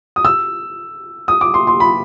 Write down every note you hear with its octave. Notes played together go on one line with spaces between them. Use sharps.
D#6
E6
D#6
D6
C6
C6
B5